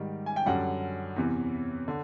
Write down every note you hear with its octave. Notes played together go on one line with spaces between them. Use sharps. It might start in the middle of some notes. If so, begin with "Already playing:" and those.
Already playing: G#2 D#3 G3
G#5
G5
F#2 D3 G3 F#5
E2 C3 E3
D3